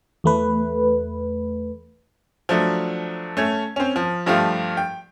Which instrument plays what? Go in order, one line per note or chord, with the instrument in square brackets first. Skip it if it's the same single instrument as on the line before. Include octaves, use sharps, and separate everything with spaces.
[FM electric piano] E2 A3 B4
[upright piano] F3 F#3 A3 D4
A3 C#4 G#6
C4 C#4
F3
G2 F3 A3 F4 G4
G5